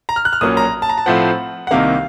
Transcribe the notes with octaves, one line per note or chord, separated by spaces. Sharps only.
A#5
F6
F#6
F6
A#1 A#2 F#3 A#3 C#4 D#6
A#5
A5
A#5
A5
A2 F3 A3 C4 F#5
F#5
C2 C3 D#3 A#3 F5